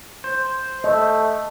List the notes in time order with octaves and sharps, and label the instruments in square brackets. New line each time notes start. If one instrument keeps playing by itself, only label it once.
[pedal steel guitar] C5
[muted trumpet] A3 [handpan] D#5